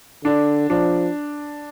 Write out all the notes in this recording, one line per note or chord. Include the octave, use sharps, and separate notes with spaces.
D3 D4
F3 D4